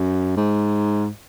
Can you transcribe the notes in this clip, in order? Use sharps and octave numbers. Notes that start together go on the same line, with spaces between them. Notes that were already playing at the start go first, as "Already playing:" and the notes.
Already playing: F#2
G#2